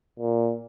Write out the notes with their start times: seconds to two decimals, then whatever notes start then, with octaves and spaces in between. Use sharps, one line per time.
0.20 A#2